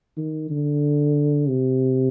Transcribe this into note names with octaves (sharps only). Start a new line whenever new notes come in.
D#3
D3
C3